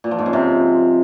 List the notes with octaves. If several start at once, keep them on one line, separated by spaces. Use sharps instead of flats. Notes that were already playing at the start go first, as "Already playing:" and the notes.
A#2
F3
G#2
C#3
C3